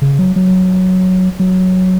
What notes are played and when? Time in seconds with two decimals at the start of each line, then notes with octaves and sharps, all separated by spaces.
0.02 C#3
0.19 F#3
0.36 F#3
1.39 F#3